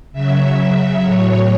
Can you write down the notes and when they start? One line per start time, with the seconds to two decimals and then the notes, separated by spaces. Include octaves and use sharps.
0.13 C#3 F#3 E5
1.03 A2 F#3 C#5